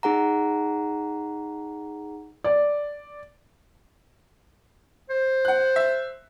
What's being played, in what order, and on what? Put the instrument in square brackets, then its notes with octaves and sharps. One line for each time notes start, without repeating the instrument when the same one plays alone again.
[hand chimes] D#4 G#4 F#5 A#5
[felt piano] D5
[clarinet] C5
[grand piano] F#5 F#6
E5